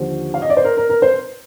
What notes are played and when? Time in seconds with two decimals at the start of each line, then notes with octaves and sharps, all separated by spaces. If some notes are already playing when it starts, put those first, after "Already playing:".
Already playing: D#2 D3 F3 C5
0.34 F5
0.42 D#5
0.50 D5
0.57 C5
0.64 A#4
0.77 A#4
0.89 A#4
1.02 C5